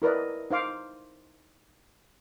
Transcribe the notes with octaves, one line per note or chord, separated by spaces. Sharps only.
E4 A#4 B4 D5 D#5
D#4 C5 F5 D6